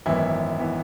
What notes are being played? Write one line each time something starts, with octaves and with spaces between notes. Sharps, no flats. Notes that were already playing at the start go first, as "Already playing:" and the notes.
G#1 F#2 E3 B3 E4
E3 B3